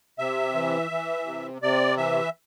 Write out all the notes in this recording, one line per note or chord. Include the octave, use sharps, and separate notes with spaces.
C3 E5
E3
E3
C3
C3 D5
E3 E5